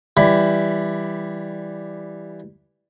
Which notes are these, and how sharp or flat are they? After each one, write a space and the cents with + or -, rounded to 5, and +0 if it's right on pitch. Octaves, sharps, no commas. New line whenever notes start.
E3 +0 G3 +0 B5 +25